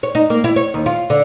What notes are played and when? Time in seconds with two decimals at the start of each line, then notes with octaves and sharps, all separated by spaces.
0.03 C#5
0.15 D#4
0.30 A#3
0.44 E4
0.56 C#5
0.74 D#2
0.86 F4
1.10 D3